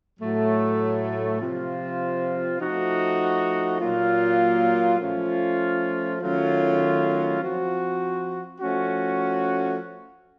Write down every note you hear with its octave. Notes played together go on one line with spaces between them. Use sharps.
A2 F#3 A3
C3 F3 C4 F4
F3 A3 D#4 F#4
A#2 F#3 A#3 F4
F3 A3 C#4 F4
D#3 F#3 A3 C#4 F4
F3 C4 F#4
F3 A3 C#4 F#4